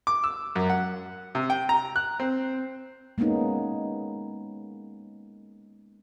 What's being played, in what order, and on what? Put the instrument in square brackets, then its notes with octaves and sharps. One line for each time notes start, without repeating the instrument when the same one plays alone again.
[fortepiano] D6
E6
F#2
F#5
C3
G5
A#5
F#6
C4
[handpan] G#3 A#3 B3 C#4 D#4